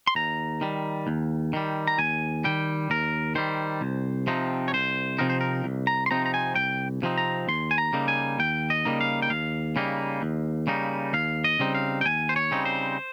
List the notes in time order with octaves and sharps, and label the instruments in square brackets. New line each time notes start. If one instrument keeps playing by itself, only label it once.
[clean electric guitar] C6
D#2 A#5
D#3 G3
D#2
D#3 G3
A#5
D#2 G#5
D#3 G3 G5
D#2 A#4
D#3 G3 C5
C2
C3 F3 C4 D#4
C#5
C2 C5
C3 F3 C4 D#4 A#4
C5
A#4
C2
A#5
C6
C3 F3 C4 D#4 A#5
A#5
G#5
C2 G5
C3 F3 C4 D#4
A#5
D#2 C6
G#5
A#5
C#3 G3 A#3 D#4
G#5
D#2 G5
D#5
C#3 G3 A#3 D#4
F5
G5
D#2 F5
C#3 G3 A#3 D#4
D#2
C#3 G3 A#3 D#4
D#2 F5
D#5
C#3 G3 C4 D#4
F5
G5
D#2 G#5
C5
C#5
C#3 G3 C4 D#4
C5